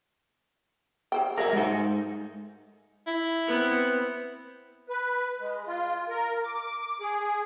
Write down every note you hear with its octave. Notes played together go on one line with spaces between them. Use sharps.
G#4 C5 G5
F#3 G#4 A#4 E5 F5
G#3 D#4 F#4 A#4 C5
A3
E4
B3 C4
B4
G#3
F4
A#4
D6
D6
G#4